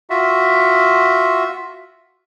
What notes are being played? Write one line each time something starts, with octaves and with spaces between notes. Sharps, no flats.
F4 F#4 E5